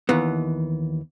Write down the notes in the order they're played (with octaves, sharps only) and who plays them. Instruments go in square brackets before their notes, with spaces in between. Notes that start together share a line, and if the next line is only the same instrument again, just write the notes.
[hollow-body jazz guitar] D#2 E3 B3